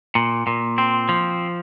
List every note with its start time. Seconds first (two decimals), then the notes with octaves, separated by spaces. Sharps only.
0.15 A#2
0.47 A#2
0.78 C4
1.09 F3